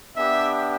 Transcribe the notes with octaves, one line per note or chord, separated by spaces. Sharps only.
B3 D4 G4 E5